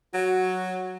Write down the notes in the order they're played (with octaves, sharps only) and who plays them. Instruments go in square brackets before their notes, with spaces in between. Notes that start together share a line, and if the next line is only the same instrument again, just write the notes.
[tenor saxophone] F#3 [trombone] F#4